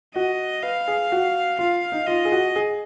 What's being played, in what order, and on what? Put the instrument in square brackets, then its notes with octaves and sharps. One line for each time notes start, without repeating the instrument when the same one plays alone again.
[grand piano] F#4 [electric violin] D#5
[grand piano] B4 [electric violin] F5
[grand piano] G#4
F#4
[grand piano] F4 [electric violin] F5
[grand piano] D#4
[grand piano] F4 [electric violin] D#5
[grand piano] G#4
F#4
G#4